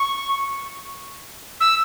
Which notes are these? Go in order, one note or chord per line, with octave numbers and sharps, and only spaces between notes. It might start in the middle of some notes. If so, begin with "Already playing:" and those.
Already playing: C#6
E6